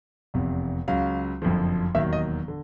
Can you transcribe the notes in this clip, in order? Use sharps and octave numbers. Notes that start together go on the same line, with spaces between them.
F1 E2 C3
C#2 C#3 F#3 F5
F#1 F2 D3 F3
E1 D#2 D#3 F#3 E5
D#5
D3